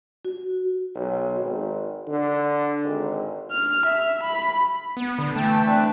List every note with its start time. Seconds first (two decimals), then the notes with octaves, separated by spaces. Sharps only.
0.25 F#4
0.95 B1
1.39 G#1
2.08 D3
2.85 G#1
3.52 F6
3.86 E5
4.23 B5
4.97 B3
5.19 D3
5.36 E3 A3 G5 A5
5.66 C4 D4 B4